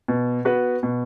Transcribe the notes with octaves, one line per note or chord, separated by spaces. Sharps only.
B2
B3 F#4 B4
B2